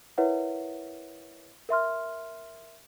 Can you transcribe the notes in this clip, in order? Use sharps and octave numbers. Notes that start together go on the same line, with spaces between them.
E4 A#4 B4 C#5 E5 F#5
A#4 E5 C6 F6